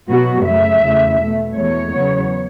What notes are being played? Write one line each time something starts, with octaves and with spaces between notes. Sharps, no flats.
B2 F#3 B3 F#4
F#2 C#3 A3 E5
E2 C#3 A3
B2 A3
E2 B2 A3 C#5
E2 C#3 F#3 B3